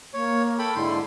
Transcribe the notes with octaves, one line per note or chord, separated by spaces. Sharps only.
A#3 C#5
A4 G5 B5
G#2 D3 E4 C6